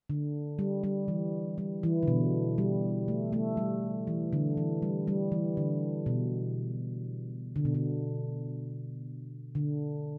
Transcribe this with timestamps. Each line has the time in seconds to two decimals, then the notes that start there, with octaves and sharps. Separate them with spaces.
0.10 D3
0.59 G3
0.84 G3
1.08 E3
1.58 G3
1.83 E3
2.03 D3
2.08 B2
2.58 G3
3.08 A3
3.33 A3
3.57 G3
4.07 E3
4.33 D3
4.57 E3
4.82 G3
5.08 G3
5.32 E3
5.57 D3
6.06 B2
7.56 D3
7.65 B2
7.74 D3
9.55 D3